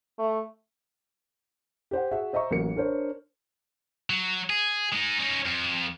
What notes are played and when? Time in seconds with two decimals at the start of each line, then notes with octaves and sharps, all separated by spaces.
0.19 A3
1.91 G4 C5 F#5
2.11 F#4 G#4 E5 F#5
2.33 C5 D#5 E5 A#5 C#6
2.51 A1 F#3 A#3 C#7
2.76 D4 A#4 C5 C#5
4.10 F#3
4.50 G#4
4.93 G#3 D#4
5.19 C#4 D#4
5.46 F2